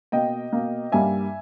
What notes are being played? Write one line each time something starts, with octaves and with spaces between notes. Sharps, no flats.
B2 A#3 D#5 G5
B2 A#3
G2 G3 A#3 E5 G#5